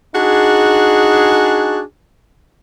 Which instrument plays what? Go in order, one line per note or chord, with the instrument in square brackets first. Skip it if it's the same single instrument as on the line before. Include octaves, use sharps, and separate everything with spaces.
[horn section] D4 D#4 F#4 G#4